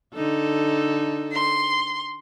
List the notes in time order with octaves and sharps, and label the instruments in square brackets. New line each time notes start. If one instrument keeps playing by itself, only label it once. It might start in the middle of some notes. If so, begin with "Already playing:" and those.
[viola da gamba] D3 D#4 A4
[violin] C6